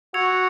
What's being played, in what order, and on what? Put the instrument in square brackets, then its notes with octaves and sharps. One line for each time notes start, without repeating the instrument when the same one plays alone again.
[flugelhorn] F#4 [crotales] E6 G#6 C#7 F7